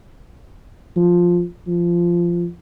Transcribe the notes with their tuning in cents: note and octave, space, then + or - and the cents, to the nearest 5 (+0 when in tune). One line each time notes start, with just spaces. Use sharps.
F3 +5
F3 -15